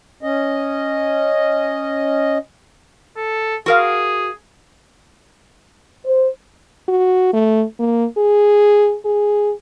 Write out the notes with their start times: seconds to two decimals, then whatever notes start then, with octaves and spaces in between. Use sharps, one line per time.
0.23 C#4 D#5
3.17 A4
3.66 F#4 G#4 A#4 F5
6.05 C5
6.89 F#4
7.33 A3
7.80 A#3
8.18 G#4
9.05 G#4